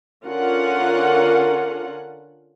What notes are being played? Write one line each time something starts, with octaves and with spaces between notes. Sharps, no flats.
D3 C#4 F4 A#4 F#5